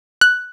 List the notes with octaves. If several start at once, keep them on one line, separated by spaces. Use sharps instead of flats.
F#6